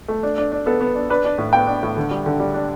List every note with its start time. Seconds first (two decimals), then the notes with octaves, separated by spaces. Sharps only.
0.08 A3
0.23 D4
0.38 D4
0.52 D4
0.66 B3 A4
0.81 B3
0.95 D4
1.10 D4 B4
1.25 D4
1.38 A2
1.53 B3 G5
1.67 D4
1.83 A2
1.97 D3
2.11 G3
2.26 D3
2.40 G3
2.54 D4